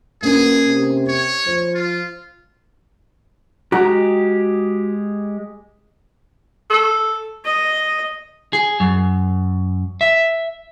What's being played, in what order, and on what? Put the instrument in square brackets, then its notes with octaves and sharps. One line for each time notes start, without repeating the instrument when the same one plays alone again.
[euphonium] B2 [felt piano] A#3 C#4 A#4 [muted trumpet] G#4
[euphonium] C3
[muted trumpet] C#5
[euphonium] F3 [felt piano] C5
[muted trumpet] F4
[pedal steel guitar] G#3 G4 [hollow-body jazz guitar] F#4 A#5
[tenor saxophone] A4
[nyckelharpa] D#5
[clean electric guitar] G#4
F#2
E5